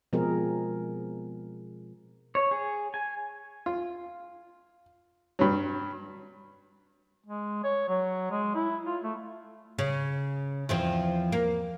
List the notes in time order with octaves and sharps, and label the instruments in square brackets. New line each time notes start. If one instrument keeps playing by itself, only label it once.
[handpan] B2 F3 G#3 C4 G#4 A#4
[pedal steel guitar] C#5
G#4
G#5
[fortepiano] F4
G2 F#3
[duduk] G#3
C#5
F#3
G#3
E4
F4
A3
[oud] C#3
E2 F3 C4
A#3